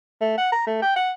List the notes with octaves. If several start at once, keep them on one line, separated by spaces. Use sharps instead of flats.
A3
F#5
A#5
A3
G5
F#5